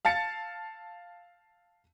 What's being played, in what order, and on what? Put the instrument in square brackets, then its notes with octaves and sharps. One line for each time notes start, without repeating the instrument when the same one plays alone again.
[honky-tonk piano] F5 A5 A6 C#7